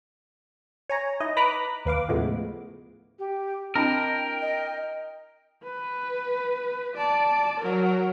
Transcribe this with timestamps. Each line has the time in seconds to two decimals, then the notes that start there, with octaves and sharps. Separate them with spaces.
0.89 C#5 G#5 A#5
1.20 D#4 E4 D#5
1.37 B4 A#5 B5 D6 D#6 F#6
1.85 D#2 B4 F5 D6
2.08 A2 C#3 F3 G#3 A3 B3
3.19 G4
3.75 C4 D4 E4 A#4 D#5 G5
4.42 D#5
5.64 B4
6.95 D5 A5
7.59 F#3 A#4